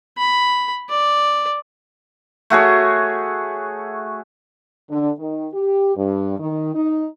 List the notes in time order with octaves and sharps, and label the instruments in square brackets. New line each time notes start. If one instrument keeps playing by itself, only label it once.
[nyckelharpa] B5
D5
[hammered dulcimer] A3 F#4 G#4 C#5
[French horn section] D3
D#3
G4
G2
D#3
D#4